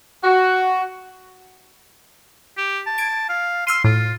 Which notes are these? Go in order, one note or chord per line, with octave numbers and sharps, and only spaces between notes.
F#4
G4
A5
G#6 D7
F5
C6 E6 F6 D#7
A2 F4